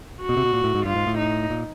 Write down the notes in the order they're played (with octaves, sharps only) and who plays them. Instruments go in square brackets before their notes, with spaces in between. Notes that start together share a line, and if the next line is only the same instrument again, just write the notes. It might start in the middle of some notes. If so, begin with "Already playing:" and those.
[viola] F#4
[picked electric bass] B2
C3
B2
A#2
A2
G#2
[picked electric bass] G2 [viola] F4
[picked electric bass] G#2
A2
[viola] D#4
[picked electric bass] A#2